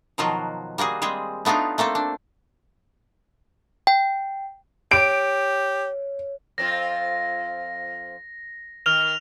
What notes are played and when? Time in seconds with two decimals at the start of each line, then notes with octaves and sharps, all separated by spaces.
0.18 B2 D#3 F3 F#3 F4 F#4
0.78 G3 A#3 F#4 G#4
1.02 G3 G#3 C4 G#4
1.45 A3 B3 D4 D#4 F4
1.78 A3 A#3 C4 A4
1.95 D4
3.87 G5
4.91 G4 C#5 D7
6.58 F2 C4 F4 A#6
8.86 D#3 F6 F7